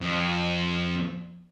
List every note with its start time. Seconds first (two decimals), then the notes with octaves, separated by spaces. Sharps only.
0.01 F2